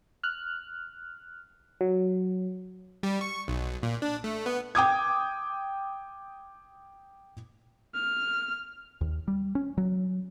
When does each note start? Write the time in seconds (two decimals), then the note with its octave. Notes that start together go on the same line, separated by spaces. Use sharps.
0.24 F6 F#6
1.81 F#3
3.03 G3
3.21 C#6
3.48 B1
3.83 A#2
4.02 D4
4.24 A3
4.46 B3
4.75 G5 D6 D#6 G#6
7.95 F6
9.01 D#2
9.28 G3
9.55 C#4
9.78 F#3